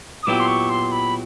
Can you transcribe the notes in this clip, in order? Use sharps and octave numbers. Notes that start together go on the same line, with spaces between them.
D#6
A#2 F#3 B3 E4 G4 D6
C6
C#6
C6
B5